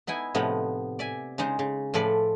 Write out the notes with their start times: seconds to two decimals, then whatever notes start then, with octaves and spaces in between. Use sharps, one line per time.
0.07 B3 D#4 E4 G#5
0.35 A2 C3 F3 B3 D#4
0.99 D5 E5 G#5
1.38 C#3 G#3 D#4 C5
1.59 C#3
1.94 A2 F3 A4 B4 D5